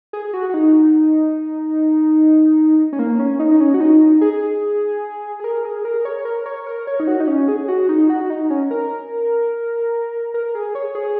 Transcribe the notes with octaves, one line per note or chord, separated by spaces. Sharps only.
G#4
F#4
F#4
D#4
C#4
A#3
C#4
D#4
D#4
C#4
F#4
D#4
G#4
G#4
A#4
G#4
A#4
C#5
A#4
C#5
A#4
C#5
D#4
F#4
D#4
C#4
G#4
F#4
D#4
F#4
D#4
C#4
A#4
A#4
G#4
C#5
G#4